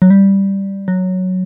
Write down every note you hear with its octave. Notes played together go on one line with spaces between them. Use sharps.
F#3
G3
F#3